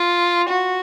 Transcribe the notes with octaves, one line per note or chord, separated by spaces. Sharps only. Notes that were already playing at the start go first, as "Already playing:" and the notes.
Already playing: F4
F#4